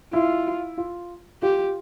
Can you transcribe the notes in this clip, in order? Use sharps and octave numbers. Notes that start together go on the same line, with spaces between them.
E4 F4
F4
F4 G4